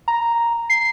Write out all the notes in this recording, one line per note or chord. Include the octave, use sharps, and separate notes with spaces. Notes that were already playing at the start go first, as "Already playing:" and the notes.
A#5
C7